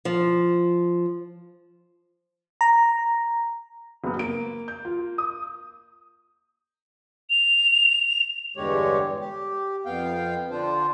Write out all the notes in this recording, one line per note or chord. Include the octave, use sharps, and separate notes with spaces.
F3
A#5
F#1 B3
A#3 D7
G6
F4
D#6
F7
E2 G2 D3 G#3 G4 C#5
G4
F2 B3 F5 G5
D3 D4 F4 C5